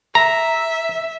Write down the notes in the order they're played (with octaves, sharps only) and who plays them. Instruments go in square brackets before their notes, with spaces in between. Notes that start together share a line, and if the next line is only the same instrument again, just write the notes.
[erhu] E5 [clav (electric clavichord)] A#5